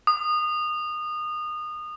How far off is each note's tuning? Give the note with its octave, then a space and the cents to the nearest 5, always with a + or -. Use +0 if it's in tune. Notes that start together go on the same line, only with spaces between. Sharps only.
D#6 -25